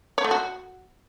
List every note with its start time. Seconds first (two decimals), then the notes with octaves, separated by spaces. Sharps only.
0.18 C#5
0.24 A3
0.31 F#4